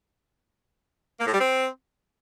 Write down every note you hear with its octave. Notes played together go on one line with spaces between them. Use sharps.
A#3
A2
G3
C4